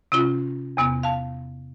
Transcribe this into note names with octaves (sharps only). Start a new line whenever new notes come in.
C3 C#4 F4
E2 C3 B3
F5 A5